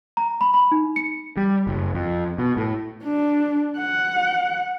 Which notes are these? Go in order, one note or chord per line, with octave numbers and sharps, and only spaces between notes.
A#5
B5
B5
D#4
C#7
G3
F#1
F2
B2
A2
D4
F#5